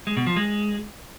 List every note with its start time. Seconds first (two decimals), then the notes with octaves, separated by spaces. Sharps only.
0.07 G#3
0.17 B2
0.27 F3
0.36 G#3